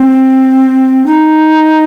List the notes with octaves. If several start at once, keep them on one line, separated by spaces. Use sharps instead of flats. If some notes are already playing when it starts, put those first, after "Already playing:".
Already playing: C4
D#4